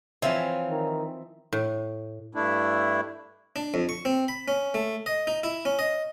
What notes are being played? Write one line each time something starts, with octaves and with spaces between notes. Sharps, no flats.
E3 F3 C4 C#5 E5 F5 G#5
D#3
A2
G2 A3 D4 E4
D4
F2
C#6
C4
B5
C#4
A3
D#5
D#4
E4
C#4
D#5